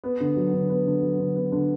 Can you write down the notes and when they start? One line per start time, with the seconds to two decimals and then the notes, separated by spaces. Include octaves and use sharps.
0.04 B3
0.20 D3
0.36 F#3
0.54 D3
0.69 B3
0.86 D3
1.02 F#3
1.19 D3
1.36 B3
1.52 D3